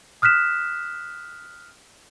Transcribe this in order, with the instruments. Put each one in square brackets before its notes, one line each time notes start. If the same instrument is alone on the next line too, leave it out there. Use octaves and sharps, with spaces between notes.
[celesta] D#6 F6 F#6 B6 E7